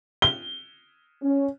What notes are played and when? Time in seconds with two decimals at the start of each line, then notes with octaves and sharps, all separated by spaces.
0.22 G7
1.21 C#4